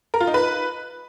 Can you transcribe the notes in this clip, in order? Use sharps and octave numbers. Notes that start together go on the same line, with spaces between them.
A#4
F4
D#4
B4